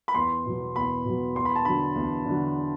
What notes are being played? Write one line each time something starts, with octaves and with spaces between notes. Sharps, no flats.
B5
E2 C6
B2 F#3
E2 B5
B2 F#3
E2 C6
B5
A5
D3 F#3 B5
E2
D3
F#3